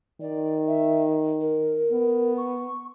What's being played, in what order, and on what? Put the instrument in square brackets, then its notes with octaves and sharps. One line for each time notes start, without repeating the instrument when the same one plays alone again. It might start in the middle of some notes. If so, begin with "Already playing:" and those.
[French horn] D#3 [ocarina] D5
[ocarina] E5
A#4
[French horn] B3
[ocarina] C#6